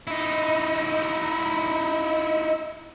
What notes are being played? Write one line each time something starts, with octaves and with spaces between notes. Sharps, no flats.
D#4 E4